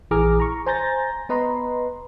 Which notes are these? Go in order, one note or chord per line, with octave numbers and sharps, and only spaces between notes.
A#1 E3 G#4 A#5 D6 F6
A#5 C#6
C5 G#5 A#5 G6 A6 A#6
B3 B4 D#5 A#5 C6